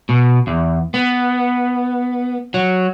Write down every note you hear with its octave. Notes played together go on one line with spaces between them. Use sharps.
B2
E2
B3
F#3